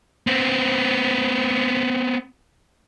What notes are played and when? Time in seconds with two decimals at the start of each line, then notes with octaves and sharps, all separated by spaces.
0.27 B3 C4